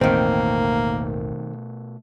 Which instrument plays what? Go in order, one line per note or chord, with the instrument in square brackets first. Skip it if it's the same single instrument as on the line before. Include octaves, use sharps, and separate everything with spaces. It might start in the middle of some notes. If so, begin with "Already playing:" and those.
[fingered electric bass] A1 E2 [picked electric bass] B2 A3 [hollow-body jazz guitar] D#3 C4 [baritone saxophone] A#3